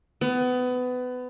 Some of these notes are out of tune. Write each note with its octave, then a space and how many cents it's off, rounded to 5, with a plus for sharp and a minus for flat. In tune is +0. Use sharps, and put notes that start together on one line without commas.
B3 +25